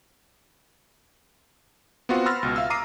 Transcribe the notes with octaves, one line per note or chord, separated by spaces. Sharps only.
B3 C4 F4 F#4 C5 F#5
B5 C6 E6 F6 A6 A#6
C#2 B2
E5 F5 E6
A#5 D6 D#6 C7 D#7